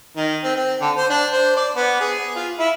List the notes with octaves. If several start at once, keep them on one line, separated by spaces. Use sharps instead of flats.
D#3
C4
C4
D3
C5
D4
C5
D5
B3
G#4
F4
E4